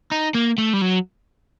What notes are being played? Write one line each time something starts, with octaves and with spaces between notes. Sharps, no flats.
D#4
A#3
A3
G3
F#3